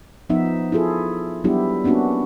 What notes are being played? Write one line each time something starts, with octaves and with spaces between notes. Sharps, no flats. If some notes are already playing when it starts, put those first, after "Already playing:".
F3 B3 D#4 E5
E4 F4 G#4 A4
F#3 G3 B3 D4 E4 G4
A#3 B3 C#4 D4 F#4